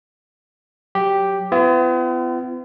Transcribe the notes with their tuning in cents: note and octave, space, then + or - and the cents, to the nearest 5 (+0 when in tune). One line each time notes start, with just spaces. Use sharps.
F#3 +0 G4 +0
B3 +40 F4 -45